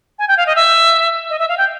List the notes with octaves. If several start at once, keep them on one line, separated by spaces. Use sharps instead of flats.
G#5
G5
F5
D#5
E5
D#5
E5
F5
G5